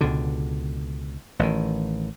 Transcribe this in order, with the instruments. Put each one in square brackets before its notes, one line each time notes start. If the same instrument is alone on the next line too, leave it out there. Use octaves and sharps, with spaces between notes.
[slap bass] C#2 B2 D3
A1 D#3